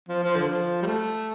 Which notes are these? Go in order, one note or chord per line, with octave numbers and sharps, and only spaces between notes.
F3
F3
D3
F3
G3
A3